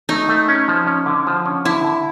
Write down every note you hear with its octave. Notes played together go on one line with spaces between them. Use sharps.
A3 D#4
A3
C#4
F3
C#4
D3
F3
C#4
D3 E4
D3